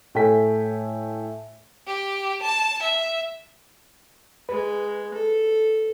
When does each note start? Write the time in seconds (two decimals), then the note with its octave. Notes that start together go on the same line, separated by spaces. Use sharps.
0.15 A2 A3 G5 G#5 B6
1.87 G4
2.42 A5
2.82 E5
4.49 G#3 B4
5.14 A4